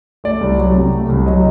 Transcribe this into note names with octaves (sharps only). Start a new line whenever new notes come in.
A3 D5
C2
F#3
C3
A3
C2
F#3 D#5